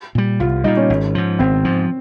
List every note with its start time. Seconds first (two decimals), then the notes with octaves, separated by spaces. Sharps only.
0.15 A#2 G3
0.40 C2 F4
0.64 A#2 G3 D#4
0.77 C#4
0.90 G#1
1.15 G#2 F3
1.39 G#1 C4
1.64 G#2 F3